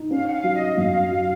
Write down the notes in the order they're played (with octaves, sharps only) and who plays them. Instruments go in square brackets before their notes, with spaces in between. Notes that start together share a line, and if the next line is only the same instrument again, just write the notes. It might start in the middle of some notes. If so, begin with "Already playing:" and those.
Already playing: [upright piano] D#4
[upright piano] C#4 [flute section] F5
[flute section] F#5
F5
[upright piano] F#3
[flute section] D#5
[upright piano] F#2 [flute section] F5
[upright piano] F#3